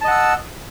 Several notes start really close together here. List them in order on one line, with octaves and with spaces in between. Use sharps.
A5 D#5 F#5 E6